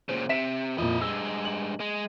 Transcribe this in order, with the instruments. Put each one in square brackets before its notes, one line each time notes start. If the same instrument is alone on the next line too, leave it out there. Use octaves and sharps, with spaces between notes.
[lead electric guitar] A#2 C#3 [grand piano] C5
[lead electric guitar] C3 [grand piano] E5 B6 E7
[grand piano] F2 A#2 [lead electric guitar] E4 D#5
[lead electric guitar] G2 G#3 [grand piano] E6
[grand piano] F#7
[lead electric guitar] G#3